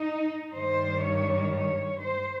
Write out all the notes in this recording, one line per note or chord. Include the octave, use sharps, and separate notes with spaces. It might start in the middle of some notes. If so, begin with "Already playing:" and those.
Already playing: D#4
G2 D#3 G3 C5
C#5
C#5
C5